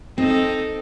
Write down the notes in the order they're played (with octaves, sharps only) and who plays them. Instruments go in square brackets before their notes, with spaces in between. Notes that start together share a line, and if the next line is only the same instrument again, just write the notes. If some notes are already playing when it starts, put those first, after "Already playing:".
[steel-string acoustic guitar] C4 [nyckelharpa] D#4 A4